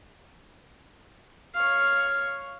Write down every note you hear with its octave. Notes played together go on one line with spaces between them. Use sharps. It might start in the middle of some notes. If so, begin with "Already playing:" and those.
C#5 F5